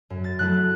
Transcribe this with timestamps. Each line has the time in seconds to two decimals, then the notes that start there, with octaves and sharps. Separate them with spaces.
0.10 F#2
0.24 A6
0.39 F#3 A3 E4 F#6